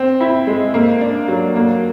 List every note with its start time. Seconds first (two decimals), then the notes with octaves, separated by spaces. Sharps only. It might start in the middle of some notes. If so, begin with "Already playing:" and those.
Already playing: C4
0.21 E4
0.47 G#3
0.74 A#3
1.01 D4
1.28 F#3
1.56 A#3